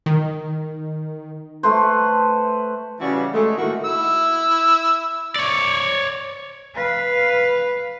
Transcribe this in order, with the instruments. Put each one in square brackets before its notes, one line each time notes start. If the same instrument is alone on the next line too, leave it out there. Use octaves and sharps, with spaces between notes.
[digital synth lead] D#3
[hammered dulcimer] A3 B4 C5
[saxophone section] C#3 E3 G3 C#4 F#4
G#3 A3
A2 D#3 A#3 E4 F#4
[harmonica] E4 E6
[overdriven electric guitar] C#5 D5
[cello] B4 F5